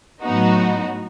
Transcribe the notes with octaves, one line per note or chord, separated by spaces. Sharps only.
A2 F#3 B3 D#4 F#4